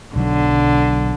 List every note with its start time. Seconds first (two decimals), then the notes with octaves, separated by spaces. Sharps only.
0.16 B1 D3 F#3